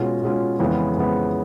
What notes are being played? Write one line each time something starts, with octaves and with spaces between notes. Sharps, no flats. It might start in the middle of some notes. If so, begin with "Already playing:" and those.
Already playing: B2 G#3 C#4 F4
B2 G#3 C#4 F4
F2 C#3 E3 G#3 B3
F2 C#3 E3 G#3 B3